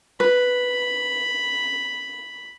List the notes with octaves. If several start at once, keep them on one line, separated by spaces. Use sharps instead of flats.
B4 B5